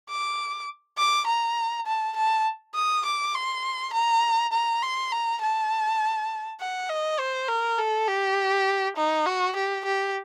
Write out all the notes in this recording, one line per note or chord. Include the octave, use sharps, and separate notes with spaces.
D6
D6
A#5
A5
A5
D#6
D6
C6
A#5
A#5
C6
A#5
A5
F#5
D#5
C5
A#4
A4
G4
D#4
F#4
G4
G4